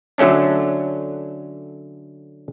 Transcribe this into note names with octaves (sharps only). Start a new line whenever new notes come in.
D3 F#3 A3 C#4 D4